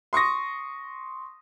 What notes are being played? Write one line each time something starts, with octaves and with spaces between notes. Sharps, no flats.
C6 C#6 D#6 A#6